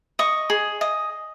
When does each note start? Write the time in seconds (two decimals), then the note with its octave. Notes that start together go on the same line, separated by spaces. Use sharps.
0.19 D#5 C#6
0.50 G#4
0.81 D#5